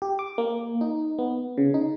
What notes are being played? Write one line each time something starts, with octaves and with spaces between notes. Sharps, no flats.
G4
D6
A#3
D#4
B3
C#3
D#4